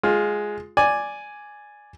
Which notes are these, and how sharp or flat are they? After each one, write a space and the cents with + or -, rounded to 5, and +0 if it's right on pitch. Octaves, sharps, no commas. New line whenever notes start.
G#3 +5 F4 +15
D5 +0 G#5 +0